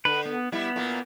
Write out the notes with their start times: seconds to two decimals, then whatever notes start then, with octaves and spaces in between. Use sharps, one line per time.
0.05 D3 B4
0.26 B3
0.52 G3 B3 E4
0.76 A#2 A#3